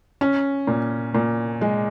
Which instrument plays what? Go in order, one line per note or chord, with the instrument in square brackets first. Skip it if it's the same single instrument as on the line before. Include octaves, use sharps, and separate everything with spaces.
[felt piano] C#4
A#2
A#2
G#3